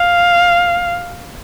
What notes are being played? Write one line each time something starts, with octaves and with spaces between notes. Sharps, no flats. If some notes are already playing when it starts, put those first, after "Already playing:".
Already playing: F5